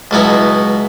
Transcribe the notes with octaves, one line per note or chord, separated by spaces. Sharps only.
C#2 B2 F#3 B3 E4